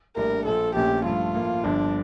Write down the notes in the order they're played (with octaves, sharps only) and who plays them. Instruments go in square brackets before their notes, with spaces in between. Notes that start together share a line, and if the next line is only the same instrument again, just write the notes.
[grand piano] A#1 A2 G3 D4 [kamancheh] A#4
[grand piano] A#1 A#2 F3 [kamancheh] A4
[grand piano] A#1 A#2 A3 C#4 [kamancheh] G4
[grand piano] G2 F3 A3 [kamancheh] F4
[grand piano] A2 F3 A#3
[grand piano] G1 G2 D3 F3 [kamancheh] D4